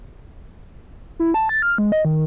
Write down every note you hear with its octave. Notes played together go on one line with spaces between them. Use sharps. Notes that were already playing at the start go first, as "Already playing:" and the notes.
E4
A5
A6
F6
G#3
D#5
D#3